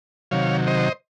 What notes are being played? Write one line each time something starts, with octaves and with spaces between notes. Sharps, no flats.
C3 D#3 F#3 C#5 F5
C5 D#5